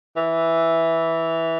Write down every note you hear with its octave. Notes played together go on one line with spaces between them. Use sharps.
E3